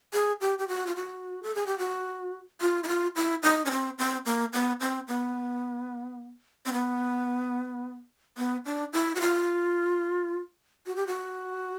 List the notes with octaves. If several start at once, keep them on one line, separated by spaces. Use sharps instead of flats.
G#4
G4
G4
F#4
F4
F#4
A4
G#4
G4
F#4
F4
E4
F4
E4
D#4
C#4
C4
C4
A#3
B3
C4
B3
C4
B3
B3
D4
E4
F#4
F4
F#4
G4
F#4